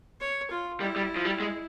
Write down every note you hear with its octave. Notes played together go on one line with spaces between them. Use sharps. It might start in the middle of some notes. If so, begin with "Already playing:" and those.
C#5
F4
G3 E4
G3
F3
G3
G#3